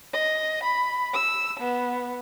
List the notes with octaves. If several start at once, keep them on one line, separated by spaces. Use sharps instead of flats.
D#5
B5
E6
B3